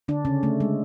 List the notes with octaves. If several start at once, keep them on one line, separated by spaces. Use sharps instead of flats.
D3 D4
C#3 C#4
A3
G#3